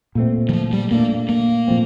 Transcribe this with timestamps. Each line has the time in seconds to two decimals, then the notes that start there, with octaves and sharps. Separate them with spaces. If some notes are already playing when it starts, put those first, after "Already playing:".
0.15 A#2 A3 C4
0.49 E3
0.53 F3
0.73 G3
0.91 A#2 A3 A#3 D4
1.29 A#3
1.68 A#2 F3 A3 C4